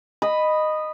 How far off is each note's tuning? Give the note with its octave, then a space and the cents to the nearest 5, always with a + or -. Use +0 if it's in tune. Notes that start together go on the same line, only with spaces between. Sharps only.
D#5 -10 B5 +0